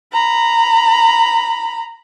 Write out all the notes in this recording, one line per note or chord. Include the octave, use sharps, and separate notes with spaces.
A#5 B5